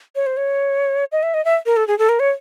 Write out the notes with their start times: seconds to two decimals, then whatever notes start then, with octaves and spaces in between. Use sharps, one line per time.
0.16 C#5
0.26 C5
0.37 C#5
1.12 D#5
1.23 E5
1.34 D#5
1.45 E5
1.66 A#4
1.77 A4
1.88 G#4
1.99 A4
2.09 A#4
2.20 C#5